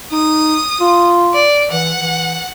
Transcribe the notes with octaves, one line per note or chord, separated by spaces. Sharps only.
D#4 D#6
F4
D5
E3 F#5
E3